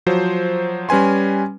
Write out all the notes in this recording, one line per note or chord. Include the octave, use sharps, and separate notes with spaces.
F3 F#3 C5
G3 C#4 B4 G#5 C6